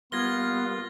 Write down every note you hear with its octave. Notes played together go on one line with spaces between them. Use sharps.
G3 A#3 B3 F4 F5 G#6 A#6 G7